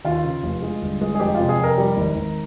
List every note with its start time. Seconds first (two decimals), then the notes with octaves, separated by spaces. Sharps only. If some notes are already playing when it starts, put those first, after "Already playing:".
0.05 D#2 F4
0.24 C#3
0.43 F1
0.62 G#3
0.82 G1
1.01 G#3
1.15 G#4
1.20 F2 G4
1.35 F4
1.40 C3
1.49 G#4
1.59 F2 A#4
1.78 G3
1.97 G#1
2.16 G#1